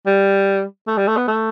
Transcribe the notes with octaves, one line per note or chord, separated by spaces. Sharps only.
G3
A3
G3
A3
B3
A3